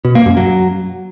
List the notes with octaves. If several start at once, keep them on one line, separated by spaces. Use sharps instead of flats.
B2
A#3
F#2
F#3